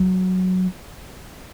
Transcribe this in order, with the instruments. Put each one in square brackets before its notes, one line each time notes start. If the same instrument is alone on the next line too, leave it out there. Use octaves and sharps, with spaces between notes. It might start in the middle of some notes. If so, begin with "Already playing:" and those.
Already playing: [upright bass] F#3